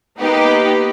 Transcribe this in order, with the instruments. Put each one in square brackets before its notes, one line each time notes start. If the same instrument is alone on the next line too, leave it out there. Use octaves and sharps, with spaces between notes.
[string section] A#3 B3 D#4 G4 B4